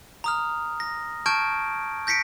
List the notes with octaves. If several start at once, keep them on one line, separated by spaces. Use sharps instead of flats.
A#5 D#6 F6
A#6
A5 C#6 F6 G6 G#6 D7
G6 A#6 B6 C#7 D7